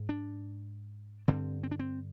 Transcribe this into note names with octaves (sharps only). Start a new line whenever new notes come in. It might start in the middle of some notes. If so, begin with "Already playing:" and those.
Already playing: G#2
D4
G2 D3 C4
C4
D4
C4